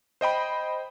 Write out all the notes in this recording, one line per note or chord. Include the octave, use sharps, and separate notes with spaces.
C5 D#5 G5 B5